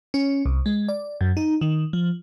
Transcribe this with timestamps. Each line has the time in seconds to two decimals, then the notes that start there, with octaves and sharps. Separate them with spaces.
0.14 C#4
0.46 C2
0.66 G#3
0.89 D5
1.21 F#2
1.37 D#4
1.61 D#3
1.93 F3